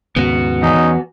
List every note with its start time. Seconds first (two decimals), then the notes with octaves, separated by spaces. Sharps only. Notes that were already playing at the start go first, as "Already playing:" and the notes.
0.16 D#2 G#2 C#3 B3 F#4
0.62 E2 C#4 D#4